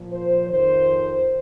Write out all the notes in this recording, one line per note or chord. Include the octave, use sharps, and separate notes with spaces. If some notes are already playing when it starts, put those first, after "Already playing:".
Already playing: A#2 F3
C5
F2 D#3 C5